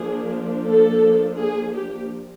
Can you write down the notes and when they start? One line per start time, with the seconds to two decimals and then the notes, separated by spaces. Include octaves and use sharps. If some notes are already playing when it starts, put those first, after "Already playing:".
Already playing: F3 A#3 D4 G#4
0.69 A4
1.39 G#4
1.74 G4